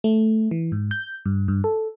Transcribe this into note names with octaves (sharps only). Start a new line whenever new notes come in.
A3
E3
G#2
G6
G2
G2
A4